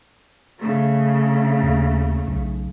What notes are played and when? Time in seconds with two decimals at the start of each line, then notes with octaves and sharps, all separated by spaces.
0.60 C#3 A3
1.63 D#2
2.28 B1